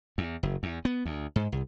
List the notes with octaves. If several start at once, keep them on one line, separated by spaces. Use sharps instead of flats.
E2
F#1
E2
B3
D2
G#2
C2